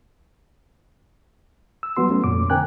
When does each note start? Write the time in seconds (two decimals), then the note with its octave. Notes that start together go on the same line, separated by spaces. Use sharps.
1.83 E6
1.97 F#3 G3 B3 F#4 C6
2.10 A3 C#4
2.24 F2 A#2 D6
2.50 D3 C4 A#4 G5 G#5 F#6